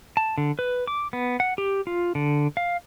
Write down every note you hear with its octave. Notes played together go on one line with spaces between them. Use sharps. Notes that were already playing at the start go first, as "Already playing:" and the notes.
A5
D3
B4
D6
B3
F#5
G4
F4
D3
F5